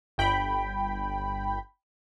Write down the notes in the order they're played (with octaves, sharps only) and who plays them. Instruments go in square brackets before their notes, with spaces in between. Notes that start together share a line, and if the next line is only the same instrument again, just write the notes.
[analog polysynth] G1 G5 B5